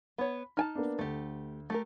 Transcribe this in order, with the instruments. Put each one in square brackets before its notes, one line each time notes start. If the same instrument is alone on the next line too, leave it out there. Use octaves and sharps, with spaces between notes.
[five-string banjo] B3 C#5 [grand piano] B5
[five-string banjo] D#4 G#5 A5 [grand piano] F6
[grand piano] A#3 B3 D4
[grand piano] D2 [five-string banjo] A3 G4
[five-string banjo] A3 G4 A#4